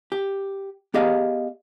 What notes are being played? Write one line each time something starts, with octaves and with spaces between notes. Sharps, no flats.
G4
B3 G4 G#4 D#5 F5